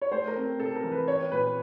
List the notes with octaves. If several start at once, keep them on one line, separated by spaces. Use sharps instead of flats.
C#5
A3 C5
A#4
C4
C3 A4
A#4
E3
B4
C4 C#5
A#2 B4